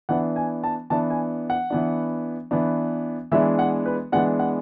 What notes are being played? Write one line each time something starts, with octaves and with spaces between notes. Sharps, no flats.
E3 B3 D4 F#5
G#5
A5
E3 B3 D4 A5
G#5
F#5
E3 B3 D4
E3 B3 D4
E3 G#3 B3 D4 E5
F#5
B4
E3 G#3 B3 D4 F#5
F#5